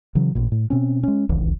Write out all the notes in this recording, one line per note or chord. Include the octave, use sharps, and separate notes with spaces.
C#3 E3 F#3
A1 A#2
A2
B2 C4 C#4
G#3 C#4
D1 G#1 C#2 E3